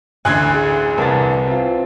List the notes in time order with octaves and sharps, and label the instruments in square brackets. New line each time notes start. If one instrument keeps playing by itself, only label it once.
[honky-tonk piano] A1 D2 D3 [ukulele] D#5 G#5 [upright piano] F#6 G#6 C7
[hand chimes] G#4
[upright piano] C2 A#4 A6 [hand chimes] B4 A5
[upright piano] C4 F4